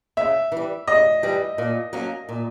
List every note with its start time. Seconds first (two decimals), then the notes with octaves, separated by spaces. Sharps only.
0.17 C#3 E5
0.52 E3 G3
0.87 C#3 D#5
1.23 E3 G3
1.58 A#2
1.93 F#3 A#3 C#4
2.29 A#2